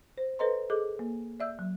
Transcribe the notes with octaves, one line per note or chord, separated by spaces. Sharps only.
C5
A4 B4 C5 D#5 A#5 C6
G#4 A4 D#5 D6
A#3
D5 E5 E6 G6
F#3